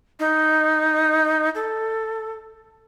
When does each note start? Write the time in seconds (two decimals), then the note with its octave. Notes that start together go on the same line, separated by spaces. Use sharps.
0.19 D#4
1.55 A4